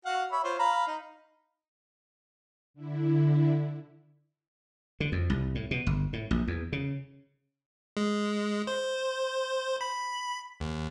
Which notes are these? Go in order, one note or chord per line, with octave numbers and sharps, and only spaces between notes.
F#4 F5 F#5
C#5 E5 B5
F4 C5 C#5
F5 A#5 B5
D#4
D3 E4
D3
F2
C2
A2
B2
G1
A2
A#1
E2
C#3
G#3
C5
B5
D#2